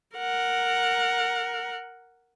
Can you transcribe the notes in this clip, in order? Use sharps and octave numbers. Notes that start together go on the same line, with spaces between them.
A#4 F#5